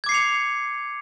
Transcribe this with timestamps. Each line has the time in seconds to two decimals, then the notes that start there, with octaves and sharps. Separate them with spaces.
0.04 G#6
0.06 D6
0.09 C7
0.12 C#7
0.14 F7